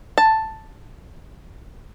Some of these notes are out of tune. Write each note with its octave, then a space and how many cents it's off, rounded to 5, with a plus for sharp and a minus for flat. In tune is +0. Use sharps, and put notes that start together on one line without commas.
A5 +5